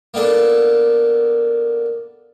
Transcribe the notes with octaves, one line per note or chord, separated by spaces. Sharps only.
A#3 B3 D4 A4